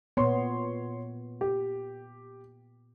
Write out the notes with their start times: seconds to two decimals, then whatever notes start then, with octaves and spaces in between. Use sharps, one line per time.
0.17 A#2 B3 C#5 C6
1.41 G4